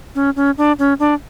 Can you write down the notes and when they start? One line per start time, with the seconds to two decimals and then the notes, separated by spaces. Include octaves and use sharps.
0.15 C#4
0.36 C#4
0.58 D4
0.79 C#4
0.99 D4